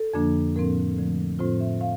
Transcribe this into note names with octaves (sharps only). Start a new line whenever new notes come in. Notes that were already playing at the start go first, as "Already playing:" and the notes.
Already playing: A4
F2 D3 F3 A#3 D4
A2 F3 C4 A#4
D3 F3 A3
A2 F3 C4 F4 C5
E5
A2 F5